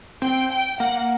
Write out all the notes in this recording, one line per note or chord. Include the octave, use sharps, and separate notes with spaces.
C4 G5
G5
A#3 F#5